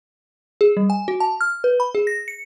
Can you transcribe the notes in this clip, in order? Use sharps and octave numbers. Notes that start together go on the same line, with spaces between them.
G#4
G3
G#5
F#4
A5
F6
B4
B5
G#4
A#6
C#7